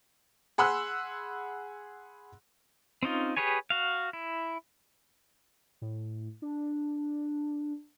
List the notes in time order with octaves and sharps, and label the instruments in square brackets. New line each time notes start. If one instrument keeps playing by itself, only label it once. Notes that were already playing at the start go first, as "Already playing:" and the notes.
[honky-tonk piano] G#4 F#5 B5 C6 E6 F#6
[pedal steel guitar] C4 C#4 D#4 F4
G4 G#4 B4 C#5 G#5
F#4 F5
E4
[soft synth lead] A2
D4